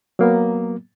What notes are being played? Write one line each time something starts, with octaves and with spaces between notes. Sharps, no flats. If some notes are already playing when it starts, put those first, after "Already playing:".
F#3 A#3 B3